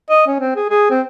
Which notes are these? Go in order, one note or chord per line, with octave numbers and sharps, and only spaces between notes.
D#5
C#4
C4
G#4
G#4
C4